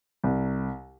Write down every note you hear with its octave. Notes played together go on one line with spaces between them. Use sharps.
C2